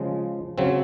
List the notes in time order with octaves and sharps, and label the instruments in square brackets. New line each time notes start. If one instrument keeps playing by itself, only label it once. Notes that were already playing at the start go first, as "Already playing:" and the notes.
Already playing: [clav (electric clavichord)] C#3 F3 G#3
C#3 F#3 C4